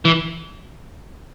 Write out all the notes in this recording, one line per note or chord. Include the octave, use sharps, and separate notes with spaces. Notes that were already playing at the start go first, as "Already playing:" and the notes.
E3